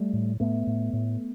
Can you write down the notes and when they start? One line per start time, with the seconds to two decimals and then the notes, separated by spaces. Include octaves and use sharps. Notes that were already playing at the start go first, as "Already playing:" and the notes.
Already playing: G3 A3
0.13 A2
0.40 A2 A3 B3
0.67 A2
0.93 A2